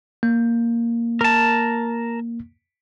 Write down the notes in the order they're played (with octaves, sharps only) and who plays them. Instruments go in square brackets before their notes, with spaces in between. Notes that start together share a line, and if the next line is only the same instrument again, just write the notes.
[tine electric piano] A#3
[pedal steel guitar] A#4 A5